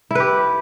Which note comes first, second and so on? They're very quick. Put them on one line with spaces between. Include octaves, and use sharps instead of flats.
E4 B4 G4